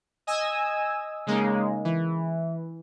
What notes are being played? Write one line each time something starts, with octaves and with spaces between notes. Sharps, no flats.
D#5 G#5 D#6 E6
C#3 G#3 A#3 D#4
E3